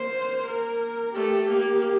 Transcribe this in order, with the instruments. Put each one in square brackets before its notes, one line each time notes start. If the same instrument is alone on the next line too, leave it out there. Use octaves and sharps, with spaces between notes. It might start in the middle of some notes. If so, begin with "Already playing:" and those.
Already playing: [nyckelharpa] A#3 [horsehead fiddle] C5
[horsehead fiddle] A#4
[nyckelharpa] A3 [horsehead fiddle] G4
[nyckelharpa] A#3